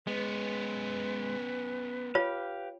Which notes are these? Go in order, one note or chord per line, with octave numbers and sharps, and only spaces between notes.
G#3 B3 C#4 B4
F4 G4 C#5 F5